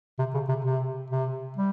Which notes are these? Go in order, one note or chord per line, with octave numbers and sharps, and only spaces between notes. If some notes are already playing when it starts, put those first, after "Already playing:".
C3
C#3
C3
C3
C3
G3